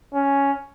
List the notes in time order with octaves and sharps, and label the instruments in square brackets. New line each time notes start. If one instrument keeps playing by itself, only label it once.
[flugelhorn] C#4